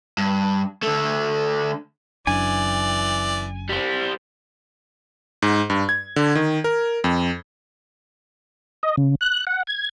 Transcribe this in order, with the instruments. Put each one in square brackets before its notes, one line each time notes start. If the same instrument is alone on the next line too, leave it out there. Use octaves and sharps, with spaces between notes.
[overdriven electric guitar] G2
D3 A3
[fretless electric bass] F#1 F#2 D4 [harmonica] E3 D5 [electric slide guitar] G#5
[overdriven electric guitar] G3 C5
[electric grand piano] G#2
G2
G#6
D3
D#3
A#4
F2
[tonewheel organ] D#5
C#3
F#6
F#5
G#6